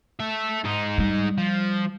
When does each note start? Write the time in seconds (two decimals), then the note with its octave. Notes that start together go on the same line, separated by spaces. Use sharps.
0.20 A4 E5
0.64 G#2 D#4
0.98 G3
1.38 F3